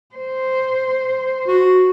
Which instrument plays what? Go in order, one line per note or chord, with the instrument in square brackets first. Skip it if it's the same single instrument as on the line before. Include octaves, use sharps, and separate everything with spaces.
[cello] C5
[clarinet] F#4